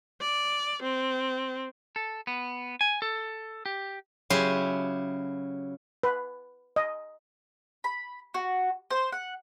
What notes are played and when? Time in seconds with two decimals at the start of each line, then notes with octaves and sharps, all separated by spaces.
0.21 D5
0.82 C4
1.96 A4
2.27 B3
2.81 G#5
3.02 A4
3.66 G4
4.30 C#3 F#3 E4 G4 G#5 C6
6.03 B4
6.76 D#5
7.84 B5
8.34 F#4
8.90 C5
9.12 F#5